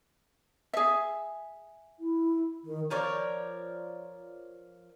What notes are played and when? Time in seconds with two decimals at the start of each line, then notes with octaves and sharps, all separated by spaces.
0.73 G#4 E5
1.99 E4
2.64 D#3
2.90 F3 A#4 C#5 D5